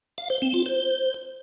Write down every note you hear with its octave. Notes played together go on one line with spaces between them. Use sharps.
F5
C5
C4
F4
C5